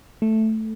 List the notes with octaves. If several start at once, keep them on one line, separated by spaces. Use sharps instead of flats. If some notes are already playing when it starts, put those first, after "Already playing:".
A3